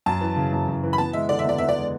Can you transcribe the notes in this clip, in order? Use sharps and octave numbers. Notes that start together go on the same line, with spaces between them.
F#2 A5
E3
C#3
F#2
F#2
E3
B5
B3 A5
G#3 E5
D3 D5
E5
E2 D5
B3 E5
D5
G#3